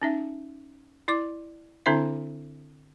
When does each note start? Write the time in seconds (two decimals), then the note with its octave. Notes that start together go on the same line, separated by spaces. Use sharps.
0.02 C#4 D#4 E5
1.08 E4 D5 D6
1.86 D3 C4 D4 E4 C5 E5